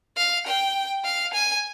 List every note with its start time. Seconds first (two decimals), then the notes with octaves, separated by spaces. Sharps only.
0.17 F5
0.47 G5
1.05 F5
1.34 G#5